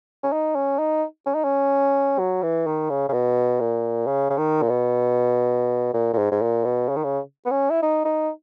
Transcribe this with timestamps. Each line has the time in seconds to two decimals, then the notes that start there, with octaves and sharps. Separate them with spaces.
0.23 C#4
0.32 D#4
0.55 C#4
0.79 D#4
1.26 C#4
1.34 D#4
1.44 C#4
2.19 F#3
2.43 E3
2.66 D#3
2.90 C#3
3.09 C#3
3.13 B2
3.60 A#2
4.07 C#3
4.30 C#3
4.38 D#3
4.62 A#2
4.69 B2
5.94 A#2
6.13 A#2
6.18 G#2
6.31 G#2
6.42 A#2
6.65 B2
6.89 C#3
6.96 D#3
7.04 C#3
7.46 B3
7.51 C#4
7.70 E4
7.82 D#4
8.05 D#4